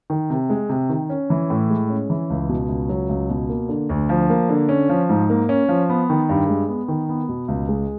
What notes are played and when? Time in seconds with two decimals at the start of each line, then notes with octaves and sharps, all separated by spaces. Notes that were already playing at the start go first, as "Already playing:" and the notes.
0.10 D#3
0.30 C3
0.50 G#3
0.69 C3
0.89 D#3
1.10 C#4
1.30 E3
1.50 A2
1.70 G#3
1.90 C#4
2.10 E3
2.30 C#2
2.49 B2
2.69 C#2
2.89 F#3
3.09 C#2
3.29 B2
3.49 A#3
3.69 D3
3.89 D2
4.09 F3
4.30 A#3
4.49 D3
4.69 C#4
4.89 F3
5.09 G#2
5.30 A#3
5.49 C#4
5.69 F3
5.89 B3
6.10 D#3
6.29 G2
6.49 G#3
6.69 B3
6.88 D#3
7.09 B3
7.29 B2
7.48 C#2
7.68 G#3